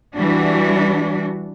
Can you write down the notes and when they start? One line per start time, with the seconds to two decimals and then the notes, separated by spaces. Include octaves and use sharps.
0.15 E3 G3 D4 F#4